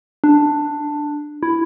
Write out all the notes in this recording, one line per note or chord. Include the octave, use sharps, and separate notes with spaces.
D4
E4